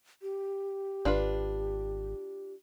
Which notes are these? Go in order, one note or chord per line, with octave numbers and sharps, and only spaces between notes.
G4
G#1 D4 F4 B4